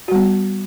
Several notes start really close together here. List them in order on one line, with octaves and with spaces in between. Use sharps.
F#4 G3 B3